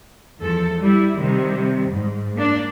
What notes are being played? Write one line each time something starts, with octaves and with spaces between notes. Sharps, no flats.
E2 F3 A4
G3 E4
C3 D#3 G3
G#2
A#3 D4